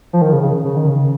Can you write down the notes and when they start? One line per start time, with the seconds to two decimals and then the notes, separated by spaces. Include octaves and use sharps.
0.13 F3
0.22 D#3
0.33 C#3
0.43 C#3
0.64 C#3
0.77 D#3
0.87 C#3